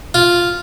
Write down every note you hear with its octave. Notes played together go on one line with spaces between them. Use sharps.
F4